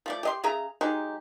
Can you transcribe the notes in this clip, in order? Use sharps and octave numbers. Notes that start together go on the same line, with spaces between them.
F3 A3 D5
G4 D#5 C6
C#3 G#4 E5 A#5
F#3 G#3 D#4 G4